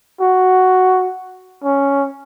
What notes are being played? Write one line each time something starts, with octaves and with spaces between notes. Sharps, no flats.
F#4
C#4